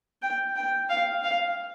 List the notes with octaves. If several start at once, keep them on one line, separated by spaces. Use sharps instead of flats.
G5
G5
F5
F5